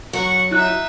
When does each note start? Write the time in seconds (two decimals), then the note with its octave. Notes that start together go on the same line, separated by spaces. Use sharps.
0.13 F#3 F#5 C#6
0.51 D#4 E4 E5 F#6